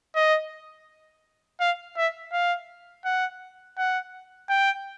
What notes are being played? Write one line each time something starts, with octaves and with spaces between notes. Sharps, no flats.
D#5
F5
E5
F5
F#5
F#5
G5